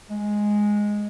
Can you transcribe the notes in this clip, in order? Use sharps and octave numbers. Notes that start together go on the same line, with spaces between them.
G#3